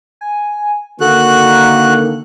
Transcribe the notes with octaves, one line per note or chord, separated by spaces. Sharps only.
G#5
D3 D#3 A#3 F#4 A4 F#6